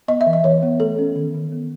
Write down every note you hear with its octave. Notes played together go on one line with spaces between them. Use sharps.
B3 D#5
E5
E3
D#5
E3 C#5
B3
A3 A4
C#4
D#3
D#3
B3